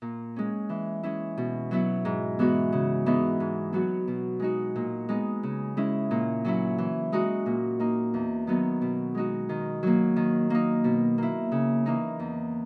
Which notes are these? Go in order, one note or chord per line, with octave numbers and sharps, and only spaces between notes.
A#2
G#3 C#4
E3
G#3 C#4 E4
B2
F#3 B3 E4
G#2
E3 G#3 B3 F#4
C#3
E3 G#3 B3 D#4
G#2
F#3 B3 F#4
B2
G#3 D#4 F#4
A#2
G#3 B3 D#4
C#3
G#3 C#4 E4
A#2
F#3 C#4 E4
E3
G#3 D#4 F#4
A#2
A#3 D#4
E2
D#3 F#3 B3 D#4
B2
G#3 D#4 F#4
D#3
F#3 A#3
D#3
A#3 D#4
B2
A#3 E4
C#3
E3 A#3 D#4
E2